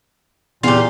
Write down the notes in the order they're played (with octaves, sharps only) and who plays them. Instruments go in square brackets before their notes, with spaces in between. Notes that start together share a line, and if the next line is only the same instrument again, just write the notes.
[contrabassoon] E2 [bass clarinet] A#2 [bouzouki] F4 G4